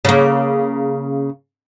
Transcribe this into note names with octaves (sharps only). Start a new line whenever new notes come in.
C#3 A#3